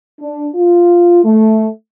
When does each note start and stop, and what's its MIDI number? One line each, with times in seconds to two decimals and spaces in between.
0.19 0.47 62
0.54 1.20 65
1.24 1.67 57